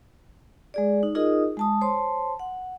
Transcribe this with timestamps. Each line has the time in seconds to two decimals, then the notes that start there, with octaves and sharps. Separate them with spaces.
0.74 G#3 G#4 D5
1.03 D#4
1.15 D#4 F4 G#4 A#4 D#5 D#6
1.57 G#3 A5 D#6
1.81 C5 C#5 A5 C6
2.39 F#5